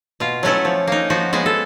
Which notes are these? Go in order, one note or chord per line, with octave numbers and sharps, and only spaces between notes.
B2 F4
F#3 A3 C#4 E4
F3
A#3 D#4
F3 F#4
G#3 B3 F#4
A4